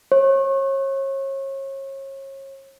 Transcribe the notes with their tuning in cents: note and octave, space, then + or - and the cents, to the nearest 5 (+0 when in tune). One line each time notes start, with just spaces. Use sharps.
C#5 -35